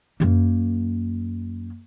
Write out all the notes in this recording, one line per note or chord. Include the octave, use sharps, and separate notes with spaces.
F#2 A#3